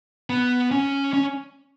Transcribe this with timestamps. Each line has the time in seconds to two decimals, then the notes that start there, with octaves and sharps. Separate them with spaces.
0.30 B3
0.71 C#4
1.14 C#4